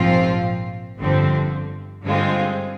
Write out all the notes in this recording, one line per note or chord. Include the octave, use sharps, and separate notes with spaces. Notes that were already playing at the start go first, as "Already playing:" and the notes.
Already playing: A#1 G#2 F3 C4 F4
G1 F2 D3 F3 C4
G2 D3 G#3 C4 F4